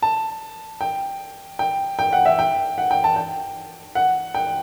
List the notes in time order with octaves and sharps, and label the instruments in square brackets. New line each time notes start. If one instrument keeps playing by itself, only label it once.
[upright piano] A5
G5
G5
G5
F#5
E5
G5
F#5
G5
A5
G5
F#5
G5